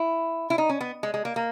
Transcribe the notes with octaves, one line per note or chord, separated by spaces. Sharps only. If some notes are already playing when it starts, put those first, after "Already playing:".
Already playing: E4
E4
D#4
C#4
B3
G#3
G#3
A#3
A#3